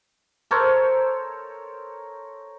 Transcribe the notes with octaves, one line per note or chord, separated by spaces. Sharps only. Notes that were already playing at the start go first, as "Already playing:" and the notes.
A4 A#4 C5 C#5